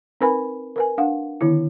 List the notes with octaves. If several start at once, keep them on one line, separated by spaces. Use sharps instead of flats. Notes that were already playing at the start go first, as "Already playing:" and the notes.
C4 D#4 A#4 B4 G#5 B5
A#4 B4 G#5
D4 F5 F#5
D3 D#3 B3 E4